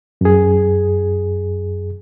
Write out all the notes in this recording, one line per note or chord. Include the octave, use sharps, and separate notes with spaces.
F#2 G#4